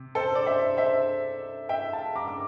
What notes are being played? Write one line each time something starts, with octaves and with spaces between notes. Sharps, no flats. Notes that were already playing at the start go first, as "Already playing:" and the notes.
Already playing: C3
A4 C5
D5
C5 E5
C5 E5
E5 G5
F5 A5
A#5 D6
D6